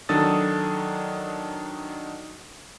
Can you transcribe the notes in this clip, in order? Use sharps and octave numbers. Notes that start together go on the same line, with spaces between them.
D#3 F#3 D4 A4 D#6 A6